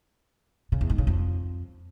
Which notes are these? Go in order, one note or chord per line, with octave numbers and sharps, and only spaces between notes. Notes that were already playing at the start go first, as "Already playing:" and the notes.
C#3
E2
G#2
C#3
F2